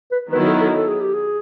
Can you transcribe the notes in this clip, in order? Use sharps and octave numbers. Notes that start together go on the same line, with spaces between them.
B4
D#3 F#3 B3 E4 B4
A4
A4
A4
G#4
G4
G#4